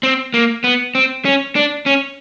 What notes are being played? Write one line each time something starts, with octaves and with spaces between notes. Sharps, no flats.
C4
A#3
B3
C4
C#4
D4
C#4